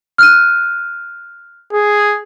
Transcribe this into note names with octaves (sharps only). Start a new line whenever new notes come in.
F6 F#6 D#7
G#4